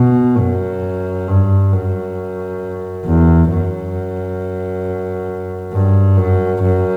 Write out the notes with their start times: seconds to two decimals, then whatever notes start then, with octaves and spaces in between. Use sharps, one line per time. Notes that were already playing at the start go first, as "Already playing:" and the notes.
Already playing: B2
0.38 F#2
1.27 G2
1.73 F#2
3.05 E2
3.50 F#2
5.73 G2
6.17 F#2
6.62 F#2